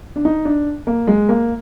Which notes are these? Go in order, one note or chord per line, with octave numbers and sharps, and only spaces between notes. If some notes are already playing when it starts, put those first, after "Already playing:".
D4
D#4
D4
A#3
G#3
A#3